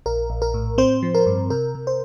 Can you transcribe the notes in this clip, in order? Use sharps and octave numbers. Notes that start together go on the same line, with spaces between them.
A#1 A#4
A#1
A#4
A2
C4 C5
F3
A#4
G2
C3 A#4
C3
C5